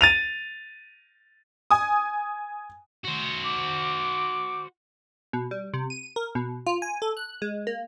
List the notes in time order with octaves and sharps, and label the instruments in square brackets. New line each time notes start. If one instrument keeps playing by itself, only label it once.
[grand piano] A6 D#7 F7
[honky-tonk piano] G#5 D#6
[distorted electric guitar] F#4 C5
[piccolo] D6
[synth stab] B2
G3
C3
D#7
A#4
B2
F4
G#5
A4
F#6
G#3
A#3